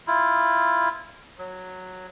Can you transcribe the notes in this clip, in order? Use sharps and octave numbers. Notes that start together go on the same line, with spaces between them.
E4 F4
F#3